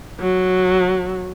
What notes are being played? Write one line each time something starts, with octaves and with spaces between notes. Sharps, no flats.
F#3